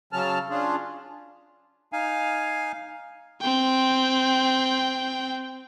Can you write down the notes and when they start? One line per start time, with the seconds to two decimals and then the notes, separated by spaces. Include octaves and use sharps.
0.13 C#3 F#3 C#4 A5 F6
0.50 C#4 D4 F4 G#4
1.92 D#4 F5 G#5
3.41 C4 G5